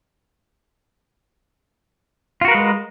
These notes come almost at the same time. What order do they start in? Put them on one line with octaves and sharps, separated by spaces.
F4 F#4 A#4 B4 G#3